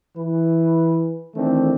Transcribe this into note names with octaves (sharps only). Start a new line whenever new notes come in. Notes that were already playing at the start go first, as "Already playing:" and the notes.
E3 B4
D#3 E3 A3 C4 D4